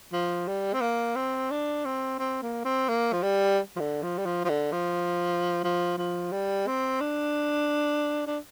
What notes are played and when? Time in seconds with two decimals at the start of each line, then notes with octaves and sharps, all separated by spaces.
0.13 F3
0.48 G3
0.73 C4
0.81 A#3
1.16 C4
1.51 D4
1.85 C4
2.19 C4
2.42 A#3
2.65 C4
2.89 A#3
3.13 F3
3.23 G3
3.76 F3
3.80 D3
4.03 F3
4.18 G3
4.26 F3
4.44 F3
4.49 D3
4.72 F3
5.64 F3
5.98 F3
6.32 G3
6.67 C4
7.01 D4
8.27 D4